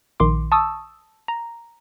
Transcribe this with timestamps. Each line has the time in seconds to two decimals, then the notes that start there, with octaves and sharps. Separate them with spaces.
0.20 A#1 D#3 C6 D6
0.52 A5 C#6 D#6 E6
1.28 A#5